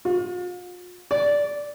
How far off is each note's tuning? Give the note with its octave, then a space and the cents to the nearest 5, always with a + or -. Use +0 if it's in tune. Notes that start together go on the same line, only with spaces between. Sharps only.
F4 +40
D5 -10